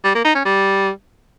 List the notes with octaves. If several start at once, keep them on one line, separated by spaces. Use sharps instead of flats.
G3
A#3
D#4
C#4
G3